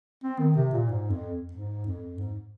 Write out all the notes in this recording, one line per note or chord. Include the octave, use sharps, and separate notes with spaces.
C4
D#3
C3
A#2
G#2
F2
G#2
F2
G#2